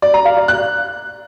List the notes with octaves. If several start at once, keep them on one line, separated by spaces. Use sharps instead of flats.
D5
A#5
F5
D5
F#6